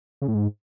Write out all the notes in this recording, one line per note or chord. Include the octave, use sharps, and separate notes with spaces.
C#3
A2
G#2